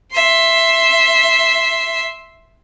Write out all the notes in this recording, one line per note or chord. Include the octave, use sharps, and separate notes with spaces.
E5 C6